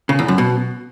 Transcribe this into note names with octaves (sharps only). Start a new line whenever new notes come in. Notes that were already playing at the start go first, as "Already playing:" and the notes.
C#3
E2
F#2
B2